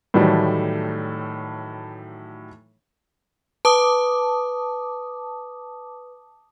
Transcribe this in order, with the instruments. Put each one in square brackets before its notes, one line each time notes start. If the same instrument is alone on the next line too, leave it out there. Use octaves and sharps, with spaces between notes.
[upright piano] A2 D#3 E3 F#3 G3 A3
[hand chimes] B4 [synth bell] A5 D6 D#6